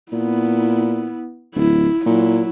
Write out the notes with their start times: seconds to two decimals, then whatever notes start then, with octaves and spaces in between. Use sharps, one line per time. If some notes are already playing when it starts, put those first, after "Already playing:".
0.12 A#2 B3 E4
1.56 D1 E4
2.06 A#2 F#3 E4